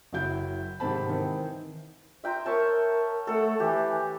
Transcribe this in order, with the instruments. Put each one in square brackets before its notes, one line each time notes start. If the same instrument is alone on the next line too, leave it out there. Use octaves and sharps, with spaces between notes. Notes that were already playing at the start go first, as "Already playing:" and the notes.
[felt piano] F#1 F#3 E4 G6
G#2 C3 D#3 C4 A5 B5
D#3 E3 C4
[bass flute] F4 [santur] E5 G5 A#5
[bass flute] A#4 [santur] C#5 E5 A5
[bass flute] A3 [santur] A4 F#5
[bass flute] E3 [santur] G4